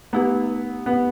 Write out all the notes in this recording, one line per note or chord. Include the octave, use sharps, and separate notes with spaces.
A3 B3 D#4 G4
B3